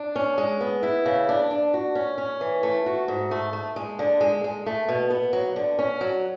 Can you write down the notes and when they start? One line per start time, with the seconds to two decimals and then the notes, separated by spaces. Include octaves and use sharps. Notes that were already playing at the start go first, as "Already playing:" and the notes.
Already playing: D4
0.16 C#4
0.38 G#3
0.61 B3
0.83 E4
1.06 C#3
1.29 D4
1.51 D4
1.74 F#4
1.95 C#4
2.18 C#4
2.41 E3
2.63 A3
2.86 F#4
3.08 G#2
3.31 A3
3.53 A3
3.76 G#3
3.99 D3
4.21 G#3
4.44 G#3
4.66 A3
4.89 B2
5.10 B3
5.33 F#3
5.56 D3
5.79 C#4
6.01 F#3